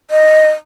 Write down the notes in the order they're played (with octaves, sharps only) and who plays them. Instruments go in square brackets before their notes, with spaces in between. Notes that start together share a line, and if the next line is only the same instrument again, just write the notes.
[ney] D#5